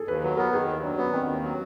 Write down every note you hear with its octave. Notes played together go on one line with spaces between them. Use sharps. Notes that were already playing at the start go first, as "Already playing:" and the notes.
Already playing: G#4 A4
D#2 B4
F#3 B4
B3 A#4
D#3 G#4
D#2
F#3 D4
B3 C#4
D#3 C4
D#2
F#3